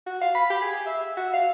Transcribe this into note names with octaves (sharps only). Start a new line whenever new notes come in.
F#4
F5
B5
G4
G#4
E5
F#4
F5